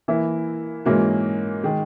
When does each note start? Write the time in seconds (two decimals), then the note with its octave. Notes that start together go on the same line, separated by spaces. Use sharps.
0.08 E3 A#3 E4
0.85 G#2 E3 A#3 C#4 F#4
1.63 D#3 G#3